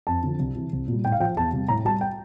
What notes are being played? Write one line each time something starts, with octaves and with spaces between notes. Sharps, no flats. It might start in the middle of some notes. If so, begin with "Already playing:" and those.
F2 A5
D3 F3
C2
C3 E3
C2
A#2 G3
A2 G5
F5
F3 G5
E2 A5
C3 G3
A2 A#5
G3 A5
G5